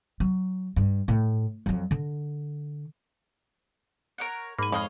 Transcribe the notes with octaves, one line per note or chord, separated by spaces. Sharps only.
F#3
G2
A2
F2 F#3
D3
A#4 C#5 F#5
G#2 A#3 G#5 B5
F2 C#5 D#5 F5